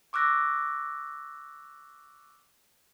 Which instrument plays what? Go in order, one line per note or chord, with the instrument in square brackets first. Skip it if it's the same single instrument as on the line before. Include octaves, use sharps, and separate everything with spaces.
[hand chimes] C#6 D6 E6 F#6 A#6